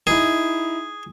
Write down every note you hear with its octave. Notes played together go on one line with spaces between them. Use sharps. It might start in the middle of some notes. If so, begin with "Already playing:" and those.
D#4 E4 G#4